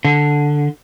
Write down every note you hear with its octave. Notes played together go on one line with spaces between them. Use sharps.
D3